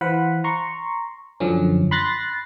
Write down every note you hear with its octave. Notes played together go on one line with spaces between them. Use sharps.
E3 C5 F5 F#5 B5
A#5 C6 C#6
F#2 D3 F3 C#4
B5 C6 F#6 A6 A#6 C7